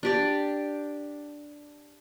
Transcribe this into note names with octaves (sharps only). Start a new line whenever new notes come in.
D4 G4 D5